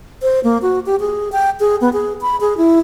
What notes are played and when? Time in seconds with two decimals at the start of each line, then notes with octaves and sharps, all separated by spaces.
0.22 C5
0.44 A#3
0.62 F#4
0.86 G4
1.00 G#4
1.32 G5
1.60 G#4
1.81 B3
1.93 G#4
2.21 B5
2.41 G#4
2.58 E4